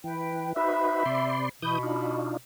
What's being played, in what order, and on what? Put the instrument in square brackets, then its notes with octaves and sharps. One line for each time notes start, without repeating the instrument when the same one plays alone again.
[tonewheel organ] E3 [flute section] B4 G5
[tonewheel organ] D#4 F#4 B4 [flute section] C5 B5 [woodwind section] E5
[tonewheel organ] C3 D5 C6
[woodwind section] B2 [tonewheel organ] E3 D#6 G6 [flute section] B5
[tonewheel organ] D4 D#4 F4